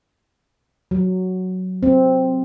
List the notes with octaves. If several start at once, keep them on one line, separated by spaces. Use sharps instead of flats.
F#3
C4